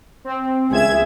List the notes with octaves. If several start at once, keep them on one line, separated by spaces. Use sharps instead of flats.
C4
C#2 G#4 E5 G#6 E7